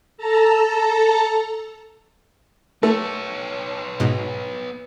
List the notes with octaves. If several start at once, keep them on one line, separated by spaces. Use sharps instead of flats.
A4 A5 A#5
A3 B3 C#5
G#2 B2